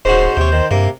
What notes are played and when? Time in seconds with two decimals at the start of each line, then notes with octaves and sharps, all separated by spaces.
0.05 D#1 G#2 C#4 F#4 C5
0.37 D#2 C3 C#5
0.52 D#3
0.71 G2 C3 A#3